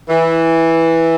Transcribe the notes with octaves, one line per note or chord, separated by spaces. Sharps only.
E3